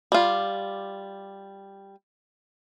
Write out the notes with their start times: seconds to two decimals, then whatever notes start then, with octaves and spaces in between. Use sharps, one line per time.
0.12 G3 F4